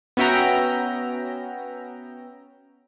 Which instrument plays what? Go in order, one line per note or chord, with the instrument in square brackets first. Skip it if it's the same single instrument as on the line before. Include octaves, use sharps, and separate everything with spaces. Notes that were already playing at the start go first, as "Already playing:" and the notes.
[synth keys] B3 C#4 F#4 E5 G5 A#5